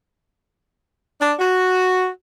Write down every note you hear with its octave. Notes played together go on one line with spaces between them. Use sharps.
D4
F#4